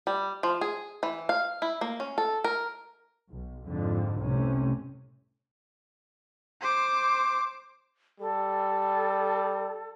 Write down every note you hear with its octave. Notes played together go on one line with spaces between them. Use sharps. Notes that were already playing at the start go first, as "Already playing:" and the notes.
G3
F3
G#4
E3
F5
E4
A#3
C#4
A4
A#4
B1
F2 G#2 D3
F1 C2 A2 C3 C#4
C5 D6
G3 A4